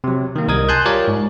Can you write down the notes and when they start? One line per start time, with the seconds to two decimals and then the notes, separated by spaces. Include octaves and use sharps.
0.04 C3 F#3
0.36 D#3 A#3
0.48 C2 G3 A#4 D#5 D#6 G#6
0.69 G#5 A5 C6 F#6 G6
0.85 F4 G4 A#4 C#5 D5
1.08 G#2